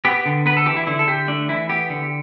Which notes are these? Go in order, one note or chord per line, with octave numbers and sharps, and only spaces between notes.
B3 G4
D3
B3 B4
A4
E3 G4
E4
D3 E4
A4
D3 G4
A3 D4
E3 E4
B3 G4
D3